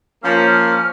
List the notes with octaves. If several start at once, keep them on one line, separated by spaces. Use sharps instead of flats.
F3 A#3 C#4 F6